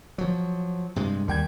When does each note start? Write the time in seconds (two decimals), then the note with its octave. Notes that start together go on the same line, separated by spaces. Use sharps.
0.18 F3 F#3
0.96 G2 C3 G#3
1.28 D#2 G3 G5 G#6